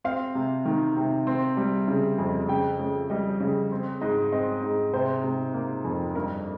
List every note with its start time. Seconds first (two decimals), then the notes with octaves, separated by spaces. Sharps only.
0.04 C4 F5
0.35 C3
0.66 D#3
0.96 C3
1.27 C4
1.57 G3
1.88 C#3
2.18 F2
2.49 C#3 G5
2.79 C#3
3.10 G3 D#5
3.40 C#3
3.72 C4
4.01 G#2 D#5
4.32 C4 D#5
4.63 G#2
4.93 C3 C5
5.24 C3
5.54 A#3
5.85 F2
6.15 G2 A#4